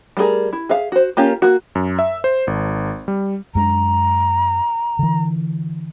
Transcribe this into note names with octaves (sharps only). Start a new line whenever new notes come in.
G3 A3 B3 G#4 A#4
E4
G#4 E5 F5
F#4 C5
A#3 C#4 F4 G4 A#4
A#3 F#4
F#2
E5
C5
G#1
G3
F#2 G#3 D4 A#5
D3 E3